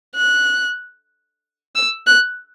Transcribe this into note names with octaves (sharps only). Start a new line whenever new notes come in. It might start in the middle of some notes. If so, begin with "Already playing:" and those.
F#6
E6
F#6